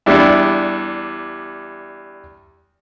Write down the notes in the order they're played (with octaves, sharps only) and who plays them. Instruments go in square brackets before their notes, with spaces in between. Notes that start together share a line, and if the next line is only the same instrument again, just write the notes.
[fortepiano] E2 G3 D4 E4